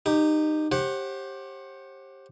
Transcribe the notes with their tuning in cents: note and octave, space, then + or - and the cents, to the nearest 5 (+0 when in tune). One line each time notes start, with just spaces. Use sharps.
D#4 -20 G4 +0
G4 +0 C5 +40 F#5 +0